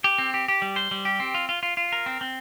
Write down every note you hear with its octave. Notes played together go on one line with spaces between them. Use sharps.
G4
C4
G4
G4
G3
C5
G3
G4
C4
F4
F4
F4
F4
A#4
C4
C4